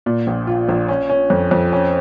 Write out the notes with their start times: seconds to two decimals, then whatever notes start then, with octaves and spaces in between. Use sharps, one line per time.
0.06 A#2
0.27 A#1
0.47 F4
0.69 A#1
0.88 C#4
1.09 C#4
1.30 F2
1.51 F2
1.72 C#4